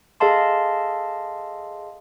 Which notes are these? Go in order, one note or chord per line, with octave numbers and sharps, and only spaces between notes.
G#4 A4 D#5 F5 A5 C6